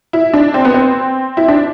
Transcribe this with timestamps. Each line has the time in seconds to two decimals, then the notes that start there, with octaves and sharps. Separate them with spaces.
0.13 E4
0.34 D4
0.54 C4
0.65 B3
0.74 C4
1.37 E4
1.48 D4